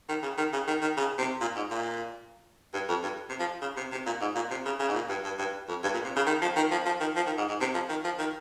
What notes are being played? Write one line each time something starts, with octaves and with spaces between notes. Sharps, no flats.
D#3
C#3
D#3
C#3
D#3
D#3
C#3
C3
A#2
G#2
A#2
G2
F2
G2
C3
F3
C#3
C3
C3
A#2
G#2
A#2
C3
C#3
C#3
G#2
A#2
G2
G2
G2
F2
G2
A#2
C3
C#3
D#3
F3
D#3
F3
F3
D#3
F3
D#3
G#2
G#2
C3
F3
D#3
F3
D#3